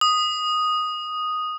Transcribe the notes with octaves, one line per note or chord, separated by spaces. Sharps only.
D#6